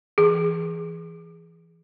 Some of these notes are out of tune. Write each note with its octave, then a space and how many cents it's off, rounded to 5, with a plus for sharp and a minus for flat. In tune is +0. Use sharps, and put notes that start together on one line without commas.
E3 +15 G#4 +0